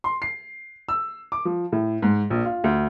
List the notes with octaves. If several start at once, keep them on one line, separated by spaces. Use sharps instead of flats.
C6
C7
E6
D6
F3
A2
G#2
A#1
F4
D2